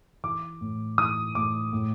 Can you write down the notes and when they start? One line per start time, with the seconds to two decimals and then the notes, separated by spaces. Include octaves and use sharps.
0.24 E3 D6
0.61 A2
0.98 E3 D#6
1.35 A2 D6
1.73 A2